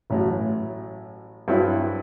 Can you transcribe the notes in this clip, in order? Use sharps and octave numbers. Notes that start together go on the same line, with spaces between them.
A1 A2 F#3
G2 F#3 C4 E4